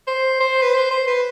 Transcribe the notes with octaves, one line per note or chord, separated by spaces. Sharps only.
C5
C5
B4
C5
C5
B4